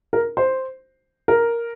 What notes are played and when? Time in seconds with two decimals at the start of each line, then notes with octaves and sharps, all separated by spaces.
0.13 A#4
0.37 C5
1.28 A#4